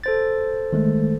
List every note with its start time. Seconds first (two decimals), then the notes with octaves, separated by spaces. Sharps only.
0.04 A4 C5 A6
0.72 D#3 G#3 A3